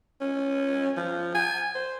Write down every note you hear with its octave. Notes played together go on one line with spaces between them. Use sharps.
C#4
F3
G#5
C5